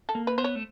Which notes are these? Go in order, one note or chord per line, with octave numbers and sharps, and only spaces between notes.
A4
A#3
B4
B3 C5
C#5
A3